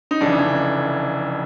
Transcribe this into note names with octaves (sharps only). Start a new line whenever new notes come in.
D#4
F1 F2 C#3 E3 D4